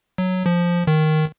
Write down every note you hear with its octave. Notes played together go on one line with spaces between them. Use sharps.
F#3
F3
D#3